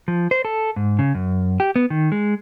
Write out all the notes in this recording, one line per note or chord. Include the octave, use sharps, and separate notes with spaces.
F3
C5
A4
G#2
C#3
F#2
G4
B3
D#3
G#3